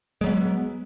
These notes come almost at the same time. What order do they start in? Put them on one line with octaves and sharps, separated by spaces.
G#3 F#3 B3